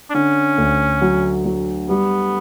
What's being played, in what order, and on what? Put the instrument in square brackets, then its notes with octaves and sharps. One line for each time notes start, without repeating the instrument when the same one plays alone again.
[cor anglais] D4
[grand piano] D3 [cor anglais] C#4
[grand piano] D2
F#3
F#3
[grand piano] G3 [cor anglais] B3